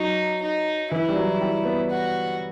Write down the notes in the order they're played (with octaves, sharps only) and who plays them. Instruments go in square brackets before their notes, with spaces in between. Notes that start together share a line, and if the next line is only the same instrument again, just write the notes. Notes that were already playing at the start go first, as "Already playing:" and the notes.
Already playing: [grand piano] F#3 [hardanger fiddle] D#4
[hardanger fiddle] D#4
[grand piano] E3 [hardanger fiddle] E4
[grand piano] G3
F#3
G3
B3
[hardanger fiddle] F#4